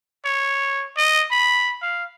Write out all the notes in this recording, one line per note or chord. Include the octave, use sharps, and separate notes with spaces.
C#5
D#5
B5
F5